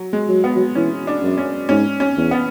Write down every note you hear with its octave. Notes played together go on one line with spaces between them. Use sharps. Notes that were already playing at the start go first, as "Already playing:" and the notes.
Already playing: F#3
G#3
F#3
B3
F#3
E3 C#4
D4
F#2
C#4
G#2 C#4
C#4
E2
B3